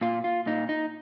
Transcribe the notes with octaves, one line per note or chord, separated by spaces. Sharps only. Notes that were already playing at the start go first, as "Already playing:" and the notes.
A#2 F4
F4
A#2 D#4
D#4